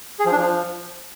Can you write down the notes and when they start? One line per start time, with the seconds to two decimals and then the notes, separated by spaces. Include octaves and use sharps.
0.19 G#4
0.26 F3
0.32 D4
0.38 F3